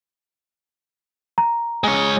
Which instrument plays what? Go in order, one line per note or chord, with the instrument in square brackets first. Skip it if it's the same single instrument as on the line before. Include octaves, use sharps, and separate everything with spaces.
[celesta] A#5
[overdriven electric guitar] G#3 C#5